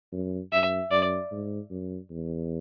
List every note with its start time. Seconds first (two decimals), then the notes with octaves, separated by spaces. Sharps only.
0.12 F#2
0.52 F#2 E5
0.91 F#2 D5
1.32 G#2
1.70 F#2
2.10 E2